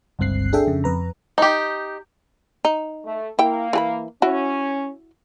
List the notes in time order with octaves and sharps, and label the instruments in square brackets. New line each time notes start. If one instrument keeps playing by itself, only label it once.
[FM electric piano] G1 C#2 G2 C4 F#6 C7
D4 G#4 A4 E5 G5
F2 C#3
F2 B4 A#5
[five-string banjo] D#4 G4
[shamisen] D#4
[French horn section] A3
[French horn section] A#3 [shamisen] E4 G5
[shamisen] E3 G#4 B5
[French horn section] C#4 [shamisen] E4 F#4